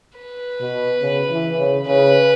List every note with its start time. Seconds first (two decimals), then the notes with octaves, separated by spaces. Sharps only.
0.18 B4
0.61 B2
1.02 C#3
1.31 E3
1.58 C#3
1.86 C#3 B4